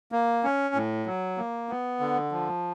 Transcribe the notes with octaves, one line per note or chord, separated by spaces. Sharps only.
A#3
C#4
A2
F#3
A#3
B3
D3
F3